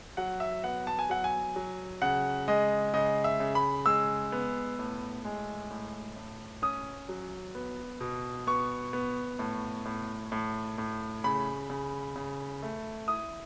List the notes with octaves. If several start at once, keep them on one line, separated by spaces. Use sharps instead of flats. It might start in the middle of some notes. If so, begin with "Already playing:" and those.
F#3 F#5
E5
B3 F#5
A5
G#5
F#3 F#5
G#5
F#3
C#3 F#5
G#3 D#5
C#3 D#5
E5
C#3
B5
G#3 E6
B3
A2
G#3
A2
A2
C#4 D#6
F#3
B3
B2
B3 C#6
B3
A2
A2
A2
A2
C#3 B5
C#3
C#3
A3
E4 D#6